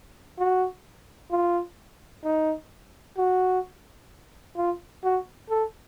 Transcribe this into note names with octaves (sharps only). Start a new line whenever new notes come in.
F#4
F4
D#4
F#4
F4
F#4
A4